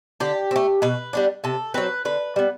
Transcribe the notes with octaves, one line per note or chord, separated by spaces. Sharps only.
D3 G4
C4
A3
B2 B4
G3 B3 D4
C3 A4
F#3 C4 B4
D3 B4
G3 B3